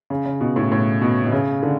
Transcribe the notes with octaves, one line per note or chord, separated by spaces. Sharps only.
C#3
C#3
B2
A2
A2
B2
B2
C#3
D3